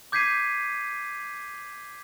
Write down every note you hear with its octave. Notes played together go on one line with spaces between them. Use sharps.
D6 G6 G#6 B6 C7 D#7